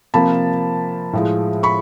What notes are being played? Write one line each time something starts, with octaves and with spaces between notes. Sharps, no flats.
C3 F3 A#3 A5 B5
A2 F3 G#3
B5 C#6